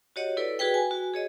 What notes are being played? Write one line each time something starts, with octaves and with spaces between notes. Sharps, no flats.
F#4 G4 C#5 D#5 F#5
E4 A4 B4 D5
F#4 G#4 B4 G5
G#5
F#4
G#4 C#5 D#5